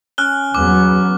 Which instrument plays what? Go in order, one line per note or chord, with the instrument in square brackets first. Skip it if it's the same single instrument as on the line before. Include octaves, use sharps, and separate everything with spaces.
[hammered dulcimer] C#4 [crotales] F6 F#6 G7
[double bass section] E2 F#3 B3 [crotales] D6